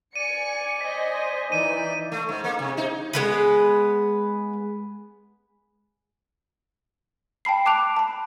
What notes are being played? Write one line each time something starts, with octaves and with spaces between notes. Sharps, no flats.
D5 G#5 C#7 D#7
C5 D#5 G#5 B6
E3 D#4 D5 G6 D#7
A3
G#2
A#3
C3
D#4
G#3 B3 B4
G5 A5 B5 C7
A5 D6 F#6 D7 F7
A5 B5